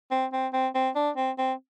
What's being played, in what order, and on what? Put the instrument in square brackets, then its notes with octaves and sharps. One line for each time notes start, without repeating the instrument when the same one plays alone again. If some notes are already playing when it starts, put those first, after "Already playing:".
[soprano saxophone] C4
C4
C4
C4
D4
C4
C4